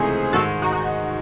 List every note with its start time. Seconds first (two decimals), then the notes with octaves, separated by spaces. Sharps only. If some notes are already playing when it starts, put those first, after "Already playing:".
Already playing: C#2 C3 E3 A3 D#4 G#4 C5
0.32 G#2 D#3 G#3 F#4 A4
0.62 D#4 F#4
0.72 D#4 F#4